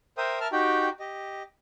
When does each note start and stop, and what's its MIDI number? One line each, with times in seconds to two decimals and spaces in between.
0.18 0.39 70
0.18 0.39 72
0.18 0.39 76
0.18 0.39 79
0.18 0.39 87
0.40 0.48 70
0.40 0.48 76
0.40 0.48 81
0.40 0.48 89
0.52 0.89 63
0.52 0.89 66
0.52 0.89 67
0.52 0.89 79
1.00 1.43 67
1.00 1.43 75